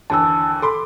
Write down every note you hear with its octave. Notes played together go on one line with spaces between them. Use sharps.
D#2 D3 E3 A5 E6
A4 B5 C6 D6